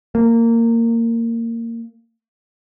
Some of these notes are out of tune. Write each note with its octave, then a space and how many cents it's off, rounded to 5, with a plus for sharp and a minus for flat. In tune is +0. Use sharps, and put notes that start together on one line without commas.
A#3 -20